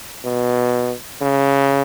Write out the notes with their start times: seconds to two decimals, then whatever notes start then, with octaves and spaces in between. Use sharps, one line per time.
0.24 B2
1.21 C#3